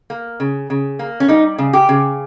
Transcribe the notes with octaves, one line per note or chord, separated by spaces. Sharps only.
A#3
C#3
C#3
A#3
C#4
G3 D#4
C#3
G4
C#3